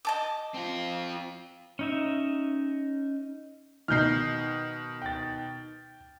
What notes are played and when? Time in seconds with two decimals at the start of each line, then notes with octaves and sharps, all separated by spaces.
0.05 D#5 A5 D6
0.54 C4 F4
1.79 C#4 D#4 E5
3.88 B2 D#3 F6 G6 C7
5.02 G5 A6